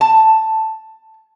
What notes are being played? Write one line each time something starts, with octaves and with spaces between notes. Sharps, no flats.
A5